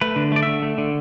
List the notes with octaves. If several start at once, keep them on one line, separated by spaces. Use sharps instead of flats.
A3 B4
D3
A3 D5
D3 E5
A3
D3